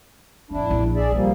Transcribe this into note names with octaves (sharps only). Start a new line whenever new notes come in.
D1 F2 D4 E4
A#1
G#4 D5 E5
C2 F3 G3 A#3